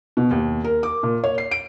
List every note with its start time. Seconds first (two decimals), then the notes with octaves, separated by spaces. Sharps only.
0.17 B2
0.31 D#2
0.64 A#4
0.83 D6
1.03 A#2
1.24 C#5
1.38 C7
1.51 D7